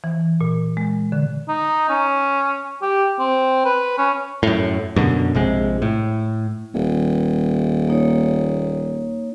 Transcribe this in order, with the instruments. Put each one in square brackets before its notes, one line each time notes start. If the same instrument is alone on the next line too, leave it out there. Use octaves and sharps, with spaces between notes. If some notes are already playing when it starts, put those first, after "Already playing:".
[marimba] E3
A#2
G#3
D3
[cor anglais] D#4
C#4
G4
C4
B4
C#4
[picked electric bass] F#2 A2
F#2 B2 D3
A#1 C3 G#3
A2
[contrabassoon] D#1
[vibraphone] A#3 D#4 C#5